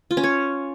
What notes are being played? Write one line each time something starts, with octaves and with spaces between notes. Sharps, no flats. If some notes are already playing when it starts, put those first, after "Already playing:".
F4
C#4
C#5